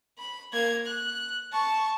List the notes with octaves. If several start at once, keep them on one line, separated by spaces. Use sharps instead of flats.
B5
A#3 G#6
F#6
A5 C#6